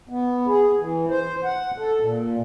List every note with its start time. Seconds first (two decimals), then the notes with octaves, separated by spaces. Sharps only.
0.09 B3
0.47 G#4
0.80 E3
1.09 C5
1.44 F#5
1.78 A4
2.01 A#2